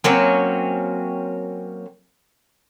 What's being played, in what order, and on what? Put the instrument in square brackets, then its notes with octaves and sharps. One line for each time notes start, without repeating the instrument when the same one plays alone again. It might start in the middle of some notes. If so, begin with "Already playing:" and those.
[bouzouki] F#3 A#3 C4 C#4